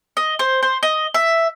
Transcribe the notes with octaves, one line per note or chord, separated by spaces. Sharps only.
D#5
C5
C5
D#5
E5